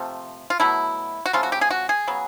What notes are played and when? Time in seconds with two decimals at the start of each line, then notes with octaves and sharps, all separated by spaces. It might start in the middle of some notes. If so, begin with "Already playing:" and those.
Already playing: C3 F3 A3
0.50 F4
0.60 B2 F#3 A3 E4
1.26 F#4
1.33 C#3 F3 A3 F4
1.43 F#4
1.52 G4
1.61 G#4
1.71 F#4
1.89 G#4
2.08 C#3 F#3 B3